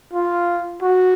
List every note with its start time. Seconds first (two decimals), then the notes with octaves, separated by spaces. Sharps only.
0.13 F4
0.82 F#4